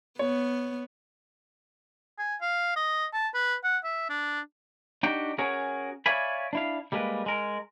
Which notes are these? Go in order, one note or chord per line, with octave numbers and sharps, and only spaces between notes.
B3 C#5
G#5
F5
D#5
A5
B4
F#5
E5
D4
D4 D#4 F#4 G4 G5
C#4 F#4 G#4 A#4
C#5 D5 E5 F5 G#5 B5
D4 E4 F5
G3 G#3 A#3 A#4 B4
G#3 A#4